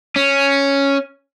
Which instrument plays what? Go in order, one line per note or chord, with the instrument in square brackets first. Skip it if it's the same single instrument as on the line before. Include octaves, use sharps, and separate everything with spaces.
[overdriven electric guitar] C#4